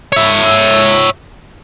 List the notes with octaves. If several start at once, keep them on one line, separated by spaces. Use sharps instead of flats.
C#5 E5